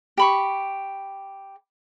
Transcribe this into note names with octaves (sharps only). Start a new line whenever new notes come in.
G4 B5 C#6